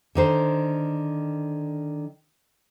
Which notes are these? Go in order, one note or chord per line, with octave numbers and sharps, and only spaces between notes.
D3 D#3 C5